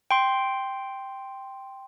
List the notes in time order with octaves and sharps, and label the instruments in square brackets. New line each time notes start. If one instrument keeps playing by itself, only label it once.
[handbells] G5 C6